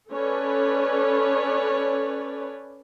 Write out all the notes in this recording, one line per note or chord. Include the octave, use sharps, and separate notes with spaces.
C#4 A4 B4 C#5 D5